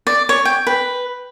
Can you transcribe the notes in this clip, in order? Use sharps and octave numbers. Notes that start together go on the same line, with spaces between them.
D5
C#5
G5
B4